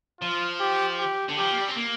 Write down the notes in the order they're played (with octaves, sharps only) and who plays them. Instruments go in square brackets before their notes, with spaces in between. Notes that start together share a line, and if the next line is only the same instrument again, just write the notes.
[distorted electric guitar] F3 [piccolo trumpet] F4
[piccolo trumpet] G4
G4
[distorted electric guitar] D3
[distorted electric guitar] F3 [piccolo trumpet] G4
[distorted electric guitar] A#3
G3
C4
A#3